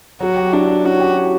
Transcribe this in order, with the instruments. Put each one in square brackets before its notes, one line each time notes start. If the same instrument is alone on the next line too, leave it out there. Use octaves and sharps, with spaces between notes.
[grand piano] F#3 [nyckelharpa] F#4
[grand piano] G4
[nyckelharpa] D4 [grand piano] E4
[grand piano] E4
[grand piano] C#4 [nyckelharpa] F#4
[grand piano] G4
E4